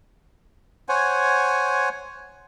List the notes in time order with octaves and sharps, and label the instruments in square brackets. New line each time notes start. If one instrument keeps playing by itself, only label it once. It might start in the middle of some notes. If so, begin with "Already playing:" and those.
[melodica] C5 C#5 F#5 G#5